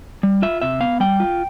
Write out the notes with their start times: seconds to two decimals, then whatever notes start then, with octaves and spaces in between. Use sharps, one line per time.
0.23 G3
0.42 F4 E5
0.62 C3 E5
0.80 B3 F5
1.00 G3 G5
1.20 F4